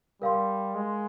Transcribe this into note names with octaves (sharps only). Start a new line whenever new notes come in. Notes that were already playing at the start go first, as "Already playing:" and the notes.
G3 A#4 F5 C6
G#3